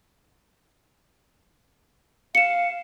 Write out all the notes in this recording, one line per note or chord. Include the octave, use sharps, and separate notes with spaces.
F5 C#7 E7